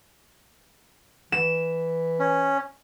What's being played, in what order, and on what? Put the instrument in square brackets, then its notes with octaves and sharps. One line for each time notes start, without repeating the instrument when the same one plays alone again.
[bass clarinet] E3 [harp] E7
[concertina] C#4